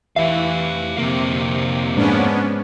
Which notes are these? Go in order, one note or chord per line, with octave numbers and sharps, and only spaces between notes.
E3 G4 E5 F5
F2 C3 A#3
G#2 B3 C#4 D4